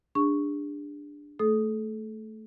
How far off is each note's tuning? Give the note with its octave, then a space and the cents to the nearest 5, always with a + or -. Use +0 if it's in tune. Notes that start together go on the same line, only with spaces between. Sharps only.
D4 +0 G#4 -35 C#6 +0
A3 +0 A4 -35 D#6 +0